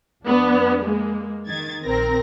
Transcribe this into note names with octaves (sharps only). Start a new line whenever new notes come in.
F2 B3 D4
G#3 A#3
D#3 G#6 A6
A#1 C4 A#4 A#6